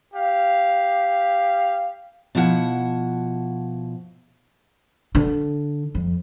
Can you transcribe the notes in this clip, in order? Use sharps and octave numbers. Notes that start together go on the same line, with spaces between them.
G4 F5
B2 F3 E4 G#4 F#5 A5
D3
F2